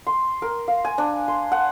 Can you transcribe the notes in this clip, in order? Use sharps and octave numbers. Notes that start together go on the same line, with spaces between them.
C6
A#4
F5
G#5
D4
C6
F#5